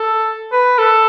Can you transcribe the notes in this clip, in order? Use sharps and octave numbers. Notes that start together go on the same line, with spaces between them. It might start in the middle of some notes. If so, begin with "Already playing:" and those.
Already playing: A4
B4
A4